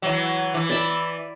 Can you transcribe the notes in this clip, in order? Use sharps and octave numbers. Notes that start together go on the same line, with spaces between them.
E3 F#3
E3
D5 E5 B5